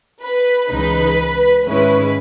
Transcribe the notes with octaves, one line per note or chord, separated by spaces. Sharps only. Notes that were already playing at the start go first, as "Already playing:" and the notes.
B4
C#2 C#3 E3 G#3 D#4 B4
G#2 D#3 G#3 C#4 E4 B4